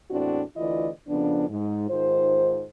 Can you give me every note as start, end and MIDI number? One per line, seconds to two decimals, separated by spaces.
0.10 0.41 40
0.10 0.41 45
0.10 0.41 60
0.10 0.41 62
0.10 0.41 66
0.57 0.89 38
0.57 0.89 52
0.57 0.89 64
0.57 0.89 65
0.57 0.89 74
0.57 0.89 75
1.08 1.48 41
1.08 1.48 49
1.08 1.48 53
1.08 1.48 59
1.08 1.48 62
1.49 1.86 44
1.89 2.63 44
1.89 2.63 51
1.89 2.63 65
1.89 2.63 72